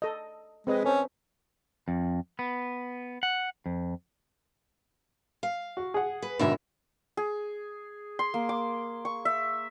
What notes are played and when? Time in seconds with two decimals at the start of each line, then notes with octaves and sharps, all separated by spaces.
0.02 A4 D#5
0.67 G#3 C4 B4 D#5
0.85 C#4 A4 C5
1.88 F2
2.39 B3
3.23 F#5
3.66 F2
5.43 F5
5.77 F#4
5.94 G#4 F#5
6.22 B4
6.39 G#1 B2 D3 A#4 E5 B5
7.17 G#4
8.19 C6
8.34 A#3
8.49 D6
9.05 C#6
9.25 E5